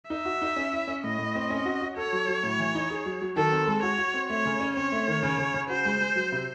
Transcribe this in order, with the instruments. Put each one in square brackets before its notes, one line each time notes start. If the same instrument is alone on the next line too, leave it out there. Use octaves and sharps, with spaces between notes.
[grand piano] D#4 [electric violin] E5
[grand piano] F#4
D#4
C#4
E4
C#4
[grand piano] A2 [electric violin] D#5
[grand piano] A2
C4
C#4
F#4
F#4
[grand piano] A4 [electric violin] C#5
[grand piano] F#3
F#3
A2
E3
D#4
G#4
F#3
F#3
[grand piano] D#3 [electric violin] A4
[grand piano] C4
G#3
[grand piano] F#4 [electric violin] C#5
[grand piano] F#4
C4
[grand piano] A3 [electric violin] C#5
[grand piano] C#3
C#4
[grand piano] C4 [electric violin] C#5
[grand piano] A3
D#3
C#3
C#3
C#3
[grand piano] F#4 [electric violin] C5
[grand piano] G#3
G#3
F#3
C3